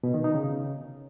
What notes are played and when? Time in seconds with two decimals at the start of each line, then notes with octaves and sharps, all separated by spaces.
0.03 B2
0.14 D#3
0.24 D#4
0.35 C#3